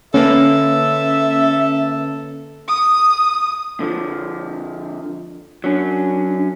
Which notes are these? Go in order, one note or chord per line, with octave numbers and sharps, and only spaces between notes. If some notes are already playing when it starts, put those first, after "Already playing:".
D3 A#3 C#4 A4 B4 E5
D#6
D3 F3
F#3 C#4 D4